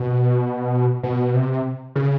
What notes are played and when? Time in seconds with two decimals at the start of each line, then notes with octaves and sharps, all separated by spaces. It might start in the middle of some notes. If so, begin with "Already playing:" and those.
Already playing: B2
1.03 B2
1.34 C3
1.95 C#3